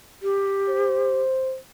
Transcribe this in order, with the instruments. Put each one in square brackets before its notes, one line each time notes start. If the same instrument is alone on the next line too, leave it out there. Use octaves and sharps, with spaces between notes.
[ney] G4
[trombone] C5